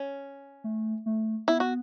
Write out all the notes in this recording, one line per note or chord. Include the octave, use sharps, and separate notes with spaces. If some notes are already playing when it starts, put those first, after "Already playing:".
Already playing: C#4
A3
A3
B3 E4
F#4